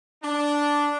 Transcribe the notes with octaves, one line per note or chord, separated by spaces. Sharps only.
D4